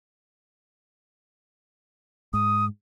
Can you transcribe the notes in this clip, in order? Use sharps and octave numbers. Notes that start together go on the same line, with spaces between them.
G#2 D#6